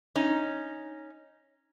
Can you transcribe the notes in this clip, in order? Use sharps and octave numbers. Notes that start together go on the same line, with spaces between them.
C#4 D#4